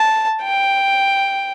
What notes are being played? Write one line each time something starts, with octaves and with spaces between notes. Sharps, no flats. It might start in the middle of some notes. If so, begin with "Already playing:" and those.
Already playing: A5
G5